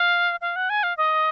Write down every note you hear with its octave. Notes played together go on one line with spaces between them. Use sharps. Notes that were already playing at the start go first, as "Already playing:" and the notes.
Already playing: F5
F5
F#5
G#5
F5
D#5